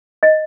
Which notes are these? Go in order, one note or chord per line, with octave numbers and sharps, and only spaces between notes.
D#5